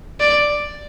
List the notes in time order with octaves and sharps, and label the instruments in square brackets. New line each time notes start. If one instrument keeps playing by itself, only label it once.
[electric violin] D5